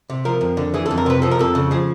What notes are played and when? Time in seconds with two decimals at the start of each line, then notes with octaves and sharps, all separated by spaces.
0.10 C3
0.25 F3 A#4
0.41 F2
0.57 D3
0.74 E3 G#4
0.86 F2 A4
0.98 A#4
1.06 C3 B4
1.22 F3 A4
1.31 A#4
1.39 F2 A4
1.55 C#3
1.71 F3 G#4